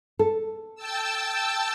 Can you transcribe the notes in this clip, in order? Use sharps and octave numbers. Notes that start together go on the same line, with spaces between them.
A4
G5 A5 E6